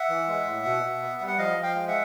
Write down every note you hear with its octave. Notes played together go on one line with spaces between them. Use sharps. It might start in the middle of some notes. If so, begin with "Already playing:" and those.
Already playing: E5 F#5
E3
G#3
A2
B2
B2
B3
G3
F#5
F3 D#5 F5
F3
F5 G5
G#3
E5 F#5